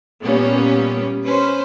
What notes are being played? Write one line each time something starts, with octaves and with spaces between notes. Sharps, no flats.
A#2 G3 A#3 B3 C#4
C#4 B4 C5